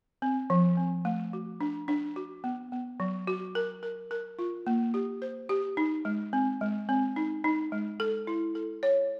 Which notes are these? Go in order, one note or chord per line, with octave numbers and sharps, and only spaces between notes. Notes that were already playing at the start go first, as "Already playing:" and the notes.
C4
F3
C4
A3
F#4
D4
D4
F#4
B3
B3
F#3
F#4
A#4
A#4
A#4
F4
A#3
G4
C5
G4
D#4
G#3
C4
G#3
C4
D#4
D#4
G#3
A4
E4
A4
C#5